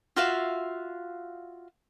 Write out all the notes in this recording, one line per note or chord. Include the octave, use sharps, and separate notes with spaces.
F4 F#4 E5 F5